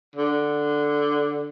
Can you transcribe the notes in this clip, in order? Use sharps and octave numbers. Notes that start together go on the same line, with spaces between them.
D3